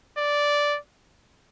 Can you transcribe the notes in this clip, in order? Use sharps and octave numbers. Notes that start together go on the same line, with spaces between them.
D5